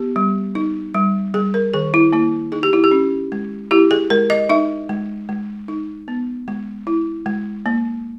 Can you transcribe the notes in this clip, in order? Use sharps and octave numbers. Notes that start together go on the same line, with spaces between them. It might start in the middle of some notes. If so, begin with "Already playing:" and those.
Already playing: B3 G4
G3
D#4
G3
G3 G#4
A#4
D#3 G#4
E4
A#3 E4
D#4 G#4
G4
E4
G4
C#4
G#3
E4 G4
G#4
G#3 A#4
D#5
D#4 E5
G#3
G#3
D#4
B3
G#3
E4
G#3
A#3